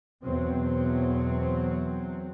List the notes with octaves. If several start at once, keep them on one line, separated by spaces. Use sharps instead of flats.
E2 B2 F#3 C4